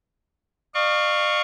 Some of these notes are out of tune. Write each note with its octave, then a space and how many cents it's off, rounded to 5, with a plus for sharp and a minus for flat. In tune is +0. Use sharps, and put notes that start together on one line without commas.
D5 +45 F5 +0 C#6 +0